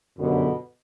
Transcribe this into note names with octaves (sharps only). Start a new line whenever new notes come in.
G1 F#2 B2 D3